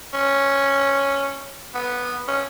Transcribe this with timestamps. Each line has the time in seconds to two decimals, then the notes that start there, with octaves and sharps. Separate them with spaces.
0.13 C#4
1.74 B3
2.28 C#4